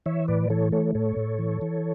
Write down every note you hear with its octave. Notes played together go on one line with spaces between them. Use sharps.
E3 C#5 E5
A2 B4 D5
E3 A4 C#5
A3 A4 C#5
A2 A4 C#5
A2
E3
E3